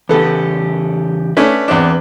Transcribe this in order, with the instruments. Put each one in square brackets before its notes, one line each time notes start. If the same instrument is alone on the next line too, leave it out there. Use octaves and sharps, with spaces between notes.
[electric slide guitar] E2 C#3 G4 [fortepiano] B3 A4
[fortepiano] A3 C#4 D4 [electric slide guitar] B4
[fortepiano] E2 C4 D4